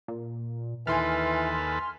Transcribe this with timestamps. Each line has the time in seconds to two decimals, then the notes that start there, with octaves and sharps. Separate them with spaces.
0.08 A#2
0.87 D#2 E3 A4 B4 G#5 C6 F6